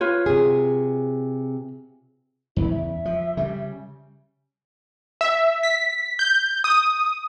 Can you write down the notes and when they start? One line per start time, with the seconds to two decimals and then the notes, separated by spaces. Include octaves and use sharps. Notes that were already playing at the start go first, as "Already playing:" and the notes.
0.01 F4 B4 C#5
0.26 C3 G#4
2.56 E2 C#3 E4
2.71 E5
3.05 F3
3.37 C#3 G3
5.21 E5
5.63 B6
6.19 G6
6.64 D#6